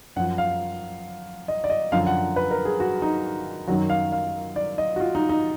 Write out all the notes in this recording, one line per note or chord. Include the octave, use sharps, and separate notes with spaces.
F#2 F3 F#5
F5
D#5
D5
D#5
F#2 D3 F3 F5
F#5
B4
A#4
G#4
F#4
D#4
F#2 D#3 F#3 F#4
F5
F5
D5
D#5
F#4
F4
D#4
D#4